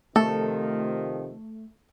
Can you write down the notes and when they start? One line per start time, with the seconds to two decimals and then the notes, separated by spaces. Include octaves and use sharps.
0.16 C3 D#3 F3 A3 A4